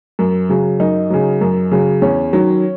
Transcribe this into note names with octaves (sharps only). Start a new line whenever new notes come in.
F#2
C#3 F#3
F#2 D#4
C#3 F#3
F#2
C#3 F#3
E2 C#4
D#3 F#3